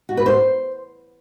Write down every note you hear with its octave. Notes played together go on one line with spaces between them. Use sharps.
F#4
B4
C5